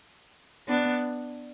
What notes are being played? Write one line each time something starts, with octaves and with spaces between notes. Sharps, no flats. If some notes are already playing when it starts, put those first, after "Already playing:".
B3 D4